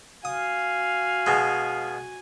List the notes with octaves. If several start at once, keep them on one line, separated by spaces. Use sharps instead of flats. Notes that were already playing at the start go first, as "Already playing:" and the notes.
F#4 F5 G#5 D#6
B2 G#3